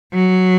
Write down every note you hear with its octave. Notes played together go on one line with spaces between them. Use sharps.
F#3